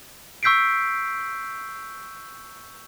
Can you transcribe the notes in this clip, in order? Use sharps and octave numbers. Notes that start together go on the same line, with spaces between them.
C#6 E6 G6 B6 C7 D7